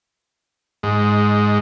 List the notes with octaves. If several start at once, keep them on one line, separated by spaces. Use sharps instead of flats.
G#2